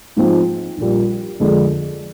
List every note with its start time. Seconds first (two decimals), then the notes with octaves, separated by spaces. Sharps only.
0.17 G#2 F3 G#3 C4 F4
0.78 A#1 A#2 G3
1.40 F2 D3 G#3 D4 G#4